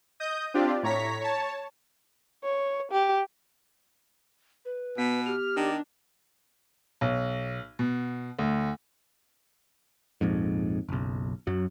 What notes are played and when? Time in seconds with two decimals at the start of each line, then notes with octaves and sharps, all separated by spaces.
0.20 D#5 D#6 G6
0.54 C4 D4 F4 G4 D5
0.83 A2 C#5 A#5 B6
1.21 C#5 A5
2.44 C#5
2.91 G4
4.65 B4
4.98 B2 B3 B6
5.26 G4 F6
5.57 D#3 D4
7.01 B1
7.79 B2
8.39 D2
10.21 A#1 F2 G#2
10.89 F#1 B1
11.47 F#2 F#3